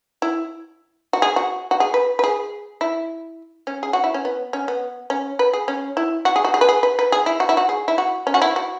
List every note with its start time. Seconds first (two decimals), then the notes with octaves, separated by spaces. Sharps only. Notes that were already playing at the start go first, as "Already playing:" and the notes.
0.22 E4
1.13 F#4
1.22 G#4
1.36 F#4
1.71 F#4
1.80 G#4
1.94 B4
2.19 B4
2.24 G#4
2.81 E4
3.67 C#4
3.83 G#4
3.93 F#4
4.04 E4
4.14 C#4
4.25 B3
4.53 C#4
4.68 B3
5.10 C#4
5.39 B4
5.53 G#4
5.68 C#4
5.97 E4
6.25 F#4
6.36 G#4
6.45 F#4
6.54 G#4
6.61 B4
6.69 G#4
6.83 B4
6.99 B4
7.12 G#4
7.26 E4
7.40 F#4
7.49 E4
7.57 F#4
7.69 G#4
7.88 E4
7.98 F#4
8.27 C#4
8.34 F#4
8.42 E4
8.56 F#4